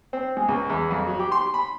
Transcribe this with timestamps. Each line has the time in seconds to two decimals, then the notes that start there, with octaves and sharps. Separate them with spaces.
0.13 C4
0.37 G#3
0.48 C#2
0.70 E2
0.91 F2
1.07 F#3
1.19 G4
1.32 C6
1.54 B5